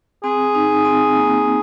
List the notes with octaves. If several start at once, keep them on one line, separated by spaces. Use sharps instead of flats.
C4 G#4
D#4
C4
A#3